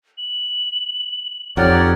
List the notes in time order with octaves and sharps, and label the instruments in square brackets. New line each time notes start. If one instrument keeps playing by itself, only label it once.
[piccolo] F#7
[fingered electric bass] F2 [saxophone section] D#4 G4 F#5 [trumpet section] C#5 D5 [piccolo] F6